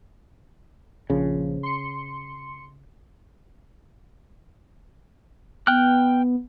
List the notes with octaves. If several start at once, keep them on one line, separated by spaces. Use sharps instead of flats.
A#1 C#3 F3
C6 C#7
B3 G5 F6 F#6